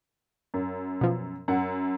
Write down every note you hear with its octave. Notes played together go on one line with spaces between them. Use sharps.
F#2
B2 F3
F#2 F#5